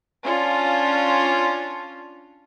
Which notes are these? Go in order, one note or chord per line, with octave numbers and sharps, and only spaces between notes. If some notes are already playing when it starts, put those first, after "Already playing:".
C#4 D4 F4